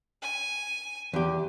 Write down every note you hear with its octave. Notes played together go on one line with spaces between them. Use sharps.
G#5
E2 G4